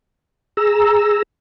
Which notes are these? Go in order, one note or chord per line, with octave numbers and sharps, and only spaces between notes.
G#4 A#5 E6